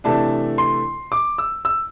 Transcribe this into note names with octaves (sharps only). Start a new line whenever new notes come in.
C3 E3 A3 D4 A5
C6
D6
E6
E6